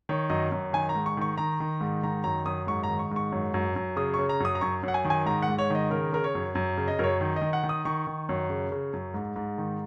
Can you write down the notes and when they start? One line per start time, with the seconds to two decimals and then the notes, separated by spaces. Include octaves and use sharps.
0.09 D#3 C#5
0.30 F#2 D#5
0.52 F#2
0.73 D#3 G#5
0.89 A#5
0.95 G#2
1.06 C#6
1.17 D#3 C#6
1.38 D#3 A#5
1.60 D#3
1.81 G#2
2.03 D#3 A#5
2.24 F#2 A#5
2.46 F#2 D#6
2.67 G#2 C#6
2.83 A#5
2.89 D#3
2.99 C#6
3.11 G#2 C#6
3.32 F#2
3.54 F#2
3.76 F#2
3.96 C#3 D#6
4.14 C#6
4.19 C#3
4.29 A#5
4.40 F#2 D#6
4.55 A#5
4.61 F#2 C#6
4.83 F#2 F#5
4.94 G#5
5.05 D#3
5.10 G#5
5.26 G#2 A#5
5.42 F#5
5.48 G#2
5.58 C#5
5.70 D#3 D#5
5.90 C#3 A#4
6.12 C#3 A#4
6.24 C#5
6.35 F#2
6.55 F#2
6.78 C#3
6.88 D#5
6.99 F#2 A#4
7.04 C#5
7.21 D#3
7.36 D#5
7.41 D#3
7.53 F#5
7.63 D#3
7.69 D#6
7.85 D#3 C#6
8.07 D#3
8.29 F#2
8.50 C#3
8.72 C#3
8.93 F#2
9.14 G#2
9.36 G#2
9.58 D#3